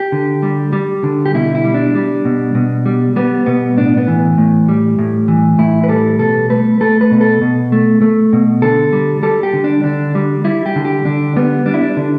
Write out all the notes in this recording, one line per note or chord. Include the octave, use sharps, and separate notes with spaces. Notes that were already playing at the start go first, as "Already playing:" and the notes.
Already playing: G4
D3
G3
G3
D3
G4
B2 E4
E4
G3
D4
G3
B2
B2
G3
G3 B3
B2 B3
A2 D4
B3
E3
A2
G3
A2
E3
A2 E4
B4
G3 A4
B2 A4
A3 B4
A3 A4
B4
B2
A4
B2
A3
A3
B2
D3 A4
G3
G3 A4
G4
D3
D4
D3 D4
G3
G3 E4
G4
D3
G4
D3 D4
G3 B3
G3 D4
E4
D4
D3